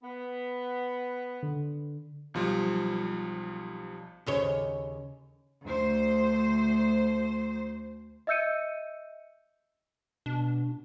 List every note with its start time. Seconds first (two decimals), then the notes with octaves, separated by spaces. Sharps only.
0.03 B3
1.43 D3
2.34 B1 F3 G3
4.26 D#2 C#3 C#5
5.65 D2 C5
8.27 D#5 E5 E6 G6 C#7 D#7
10.26 B2 D4